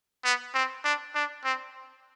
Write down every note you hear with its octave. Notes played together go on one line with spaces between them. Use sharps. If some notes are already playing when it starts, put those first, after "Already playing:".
B3
C4
D4
D4
C4